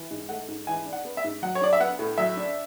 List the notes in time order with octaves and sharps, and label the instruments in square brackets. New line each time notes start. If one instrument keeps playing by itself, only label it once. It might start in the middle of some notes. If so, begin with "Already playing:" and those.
Already playing: [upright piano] E3
G#2
A3 F#5
G#2
E3 G#5
D4
F#5
B3
E5
G#2
F#3 F#5
C#5
D4 D5
E5
B3 F#5
A2
F#3 E5
D4